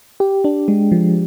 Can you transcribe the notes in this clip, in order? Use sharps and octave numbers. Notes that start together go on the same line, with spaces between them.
G4
D4
G#3
F3